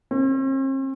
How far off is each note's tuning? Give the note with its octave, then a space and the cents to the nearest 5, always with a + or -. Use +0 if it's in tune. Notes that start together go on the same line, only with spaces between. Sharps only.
C4 +45